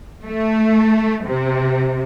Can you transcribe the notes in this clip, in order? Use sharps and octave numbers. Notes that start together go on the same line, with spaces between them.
A3
C3